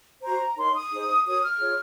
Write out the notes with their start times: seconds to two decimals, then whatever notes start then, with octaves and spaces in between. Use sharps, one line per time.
0.22 F#4 C5 A#5
0.56 D#4 A#4 C#5 C6
0.74 D#6
0.91 D#4 G#4 C5
1.24 F#4 A#4 C#5 D#6
1.41 F6
1.59 F4 G#4 C#5